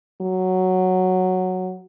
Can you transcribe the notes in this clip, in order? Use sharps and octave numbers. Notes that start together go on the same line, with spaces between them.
F#3